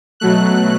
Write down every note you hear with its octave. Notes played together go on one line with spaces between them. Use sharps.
B2 F#3 A3 F#6